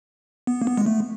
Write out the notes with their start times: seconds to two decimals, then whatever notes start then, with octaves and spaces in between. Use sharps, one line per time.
0.47 B3
0.62 A#3
0.67 B3
0.77 G#3
0.86 A3